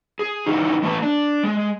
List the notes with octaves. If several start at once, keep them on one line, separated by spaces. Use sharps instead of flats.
G#4
C#3 E3 D#4
E3 A3 B4 A5
D4
G#3